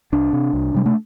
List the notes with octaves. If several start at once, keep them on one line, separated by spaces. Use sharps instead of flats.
C2 D4
C3
C2
C3 G3
A3